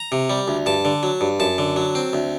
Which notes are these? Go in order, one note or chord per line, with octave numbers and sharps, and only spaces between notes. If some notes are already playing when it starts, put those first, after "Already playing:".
Already playing: A#5
C3
G3
D2
G2 A5
D3
F#3
G2
F#2 A5
D3
F#3
C4
D2